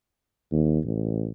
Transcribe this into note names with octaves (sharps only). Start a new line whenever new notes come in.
D#2
A1